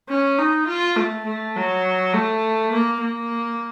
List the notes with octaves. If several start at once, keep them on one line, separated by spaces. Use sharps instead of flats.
C#4
D#4
F4
A3
A3
F#3
A3
A#3
A#3